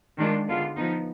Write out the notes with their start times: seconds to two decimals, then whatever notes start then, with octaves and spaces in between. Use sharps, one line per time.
0.18 D#3 G#3 D4 F4
0.47 D3 G#3 B3 F4
0.76 F3 B3 D#4